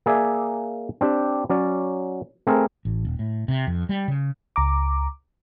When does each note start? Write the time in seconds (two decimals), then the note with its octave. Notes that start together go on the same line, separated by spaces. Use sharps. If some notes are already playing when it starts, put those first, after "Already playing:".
0.06 A#3 G#4 D5 E5 G#5
1.01 C4 D4 G4
1.50 F#3 C#4 D5
2.47 A3 C4 G#4 A#4
2.85 A1
3.05 D#1
3.19 A2
3.48 C3
3.67 F2
3.89 G3
4.08 C#3
4.56 C#2 A#5 D6